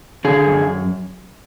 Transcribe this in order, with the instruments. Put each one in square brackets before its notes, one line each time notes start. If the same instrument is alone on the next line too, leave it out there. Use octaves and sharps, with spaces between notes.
[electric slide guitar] D3 G#4
F#2